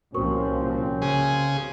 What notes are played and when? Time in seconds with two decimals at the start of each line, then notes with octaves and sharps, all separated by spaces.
0.14 C2 A#2 F3 C4 C#4 F#4 A#4 C#6
1.02 C#3 G#4